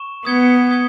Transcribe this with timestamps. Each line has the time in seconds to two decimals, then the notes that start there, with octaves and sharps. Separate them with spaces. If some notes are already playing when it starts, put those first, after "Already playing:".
Already playing: C#6 E7
0.25 B3 D#6 G#6 C#7 G7
0.71 D#6 G#6 C#7 G7